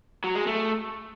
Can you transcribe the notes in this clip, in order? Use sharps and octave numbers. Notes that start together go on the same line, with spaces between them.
F#3
G#3
A3